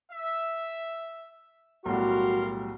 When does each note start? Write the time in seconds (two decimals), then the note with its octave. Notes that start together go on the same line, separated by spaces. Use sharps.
0.11 E5
1.86 B1 A2 G3 F#4 A#4 F5 C6